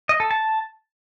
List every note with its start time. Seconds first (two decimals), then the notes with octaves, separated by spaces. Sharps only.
0.09 D#5
0.20 A4
0.31 A5